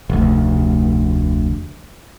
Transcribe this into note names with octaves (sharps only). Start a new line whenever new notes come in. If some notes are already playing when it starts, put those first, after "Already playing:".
F1 D2